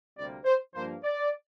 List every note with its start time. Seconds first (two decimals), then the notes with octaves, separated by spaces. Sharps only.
0.16 D2 C3 G3 A#3 D5
0.45 C5
0.74 G2 F3 A#3 C5
1.03 D5